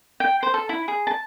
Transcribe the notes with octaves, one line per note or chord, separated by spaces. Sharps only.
G5
C5
A4
E4
G#4
A5